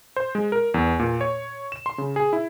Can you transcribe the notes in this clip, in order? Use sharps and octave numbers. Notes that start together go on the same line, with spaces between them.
C5
G#3
A#4
E2
A#2
C#5
E7
C6
C#3
G#4
E4